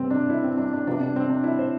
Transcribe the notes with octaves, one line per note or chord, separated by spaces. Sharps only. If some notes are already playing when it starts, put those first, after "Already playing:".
Already playing: C3 G3 B3 C4
D4
E4
C4
D4
D4
C3 F3 B3 D4
D4
C4
D4
E4
C5